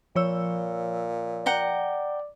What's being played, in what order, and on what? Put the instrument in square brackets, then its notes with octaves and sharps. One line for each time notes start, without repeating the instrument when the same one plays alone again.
[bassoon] A#2 [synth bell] F3 C#5 E6
[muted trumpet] D5 [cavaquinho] F#5 G5 A#5